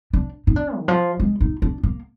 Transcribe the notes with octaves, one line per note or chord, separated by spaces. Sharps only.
D4
D#4
D4
D#3
F3
G#3
D#4
D4
A#3